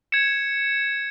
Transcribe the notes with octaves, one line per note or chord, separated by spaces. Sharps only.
G#6 C#7 E7